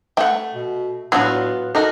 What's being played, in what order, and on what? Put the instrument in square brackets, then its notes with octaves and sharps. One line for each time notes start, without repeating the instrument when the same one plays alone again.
[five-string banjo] A3 [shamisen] F#5 G5
[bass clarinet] B2
[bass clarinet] A2 [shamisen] F#3 D4 [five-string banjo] B3 F4 F#4
[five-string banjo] D#4 F#4 A#4 [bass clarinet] A4